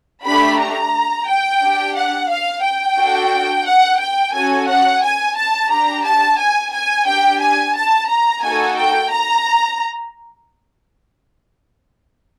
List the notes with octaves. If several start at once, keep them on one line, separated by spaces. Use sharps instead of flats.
A3 D4 G4 B5
A#5
G5
D4 G4
F#5
F5
G5
D4 F#4 A4
F#5
G5
C#4 F#4 A4 G#5
F#5
G#5
A5
D4 G4 A#5
A5
G#5
G#5
D4 G4 G5
G#5
A5
A#5
A#3 D#4 F#4 A4 G#5
G5
A#5